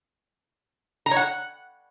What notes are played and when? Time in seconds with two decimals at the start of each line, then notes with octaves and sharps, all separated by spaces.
1.06 A#5
1.11 C#5
1.17 F#5